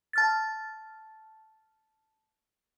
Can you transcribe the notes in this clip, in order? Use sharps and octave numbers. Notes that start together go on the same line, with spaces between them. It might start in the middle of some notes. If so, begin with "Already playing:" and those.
A5 F6 A6